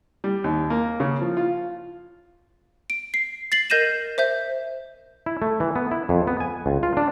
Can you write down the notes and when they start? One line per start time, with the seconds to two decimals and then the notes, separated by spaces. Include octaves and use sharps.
0.24 G3
0.44 D#2
0.70 A#3
1.00 C#3
1.21 F3
1.37 F4
2.90 D7
3.14 C7
3.52 A6 C7 F#7
3.70 A#4 D#5 G6 A#6 D#7 E7
4.18 C5 E5 G6
5.26 E4
5.42 A3
5.60 E3
5.76 B3
5.91 E4
6.09 F2
6.27 B3
6.40 G#5
6.66 C#2
6.83 F4
6.97 D4